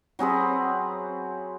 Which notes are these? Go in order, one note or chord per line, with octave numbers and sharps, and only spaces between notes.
F#3 C4 G#4 B4